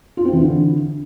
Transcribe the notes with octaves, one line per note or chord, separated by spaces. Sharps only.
F4
C4
E3
D3